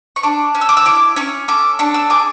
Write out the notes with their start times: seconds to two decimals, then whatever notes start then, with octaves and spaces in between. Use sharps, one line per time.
0.16 C#6
0.23 D4 D6
0.55 C#4
0.61 E6
0.69 D6
0.77 E6
0.85 E4 D6
1.16 C#4 C#6
1.48 A4 D6
1.79 D4 C#6
1.94 E6
2.10 G#4 D6